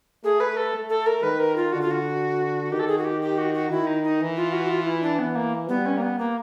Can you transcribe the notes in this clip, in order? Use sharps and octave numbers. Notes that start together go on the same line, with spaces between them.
A3 G#4
B4
A4
A3
A4
A#4
D#3 B4
A#4
F4
D3 F#4
F4
F#4
D#3 G4
A4
G#4
F#4
G4
G4
F#4
F#4
D#3 E4
D#4
D#4
E3
F4
F#4
F4
E4
D4
E3 B3
A#3
G3 B3
C#4
A#3
B3
A#3